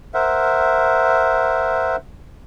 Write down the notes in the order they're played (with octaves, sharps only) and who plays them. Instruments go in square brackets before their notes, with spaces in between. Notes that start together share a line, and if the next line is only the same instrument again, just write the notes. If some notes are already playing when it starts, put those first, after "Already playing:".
[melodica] A#4 C5 E5 F#5